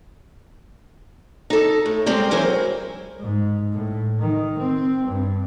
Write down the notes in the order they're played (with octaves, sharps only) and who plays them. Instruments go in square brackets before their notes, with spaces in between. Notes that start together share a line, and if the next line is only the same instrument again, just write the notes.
[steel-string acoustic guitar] D#4 A4
A2
G3 G#3 C4 A#4 C5
E3 F#3 E4 G#4 A#4 C5
[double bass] G#2
A2
D#3
C4
G2